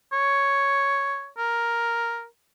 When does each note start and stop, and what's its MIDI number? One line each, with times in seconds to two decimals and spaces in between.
0.13 1.28 73
1.38 2.25 70